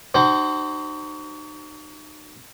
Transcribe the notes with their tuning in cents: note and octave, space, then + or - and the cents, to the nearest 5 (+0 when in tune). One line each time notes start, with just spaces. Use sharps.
D#4 -35 F#4 +35 C5 +5